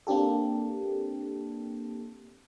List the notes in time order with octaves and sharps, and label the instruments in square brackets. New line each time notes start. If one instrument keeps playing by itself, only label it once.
[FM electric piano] A#3 C4 D4 G4 A4